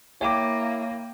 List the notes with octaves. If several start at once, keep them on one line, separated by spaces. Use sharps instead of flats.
A#3 E4 C#5 G5 D6